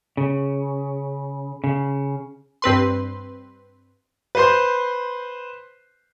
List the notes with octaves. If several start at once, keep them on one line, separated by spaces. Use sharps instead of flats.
C#3
C#3
G2 C4 B4 C6
B4 C5 C6